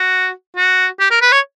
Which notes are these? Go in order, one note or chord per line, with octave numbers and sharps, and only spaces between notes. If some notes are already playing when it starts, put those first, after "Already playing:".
Already playing: F#4
F#4
G4
A#4
B4
C#5